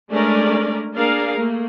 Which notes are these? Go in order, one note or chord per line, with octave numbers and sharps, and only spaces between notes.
G#3 A3 C#4 D4 A#4 D5
A#3 D4 G#4 A#4 F5
A3 A#3